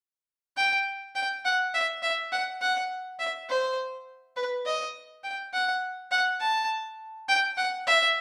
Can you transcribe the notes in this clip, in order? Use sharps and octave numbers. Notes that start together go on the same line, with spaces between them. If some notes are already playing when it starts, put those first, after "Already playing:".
G5
G5
F#5
E5
E5
F#5
F#5
E5
C5
B4
D#5
G5
F#5
F#5
A5
G5
F#5
E5